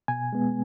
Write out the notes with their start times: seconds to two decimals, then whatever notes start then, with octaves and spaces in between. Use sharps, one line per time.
0.08 B2 G#5
0.33 G#3 B3